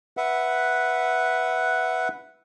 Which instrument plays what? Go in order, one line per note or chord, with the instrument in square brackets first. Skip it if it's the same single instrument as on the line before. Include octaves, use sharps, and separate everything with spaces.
[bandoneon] B4 E5 F#5